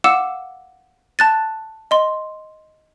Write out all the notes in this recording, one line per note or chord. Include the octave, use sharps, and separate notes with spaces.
F5 F#5 D6 E6 C#7 E7
A5 F#6 A6
D#5 C6